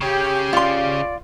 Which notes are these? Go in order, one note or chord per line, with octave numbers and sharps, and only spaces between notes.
C#3 C#4 G4 G5
F4 D5 C6